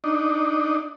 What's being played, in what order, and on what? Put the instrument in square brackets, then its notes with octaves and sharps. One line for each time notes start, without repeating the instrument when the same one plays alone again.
[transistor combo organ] D4 D#4